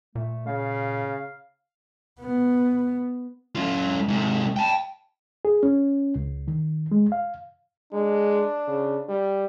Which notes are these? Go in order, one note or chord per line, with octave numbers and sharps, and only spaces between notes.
A#2 A3
C#3 F5
B3
F#2 F4
G#2 C3
G5 A5
G#4
C#4
C#2
D#3
G#3
F5
G#3 D4
C#3
G3